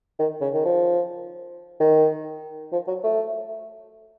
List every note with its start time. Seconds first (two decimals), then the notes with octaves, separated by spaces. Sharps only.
0.19 D#3
0.41 C#3
0.54 D#3
0.65 F3
1.80 D#3
2.72 F3
2.87 F#3
3.04 A3